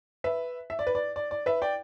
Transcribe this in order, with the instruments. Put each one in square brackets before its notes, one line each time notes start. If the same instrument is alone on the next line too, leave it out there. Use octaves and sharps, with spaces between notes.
[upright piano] B4 E5
E5
D5
B4
D5
D5
D5
B4 E5
D5 G5